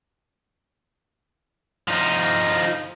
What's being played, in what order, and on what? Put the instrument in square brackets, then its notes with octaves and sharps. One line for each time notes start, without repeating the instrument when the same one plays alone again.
[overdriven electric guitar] F3 D#4